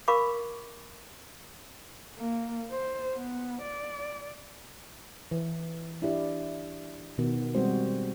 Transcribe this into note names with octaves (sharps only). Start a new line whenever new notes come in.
A#4 F5 B5 C#6 D6
A#3
C5
B3
D5
E3
D4 E4 G4 D5
B2 D#3 B3
G3 G#3 C4 F#4 C5